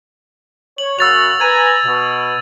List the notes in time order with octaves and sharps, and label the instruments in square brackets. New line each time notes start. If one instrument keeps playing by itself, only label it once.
[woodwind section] C#5 [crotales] F#7
[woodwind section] F#2 C#3 F#4 [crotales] E6 A6 F7
[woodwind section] B4 G#5 A#5 [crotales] G#6 D#7
[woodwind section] B2